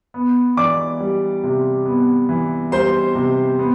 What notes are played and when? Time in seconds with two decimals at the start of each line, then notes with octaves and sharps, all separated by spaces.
0.14 B3
0.57 E3 D5 D6
1.00 G3
1.43 C3
1.86 B3
2.29 E3
2.72 G3 C5 C6
3.15 C3
3.59 B3